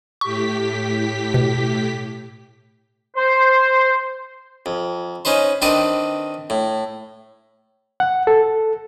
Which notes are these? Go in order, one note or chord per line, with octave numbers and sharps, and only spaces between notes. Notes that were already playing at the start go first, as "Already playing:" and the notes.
A2 G4 C#6 B6
B2
C5
F2
C#4 D#4 B4 C5
D#3 C4 D4 B4 D#5 D#6
A2
F#5
A4